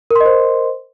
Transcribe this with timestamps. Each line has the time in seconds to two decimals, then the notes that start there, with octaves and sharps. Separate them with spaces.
0.11 A#4
0.16 C6
0.20 D#5
0.25 C5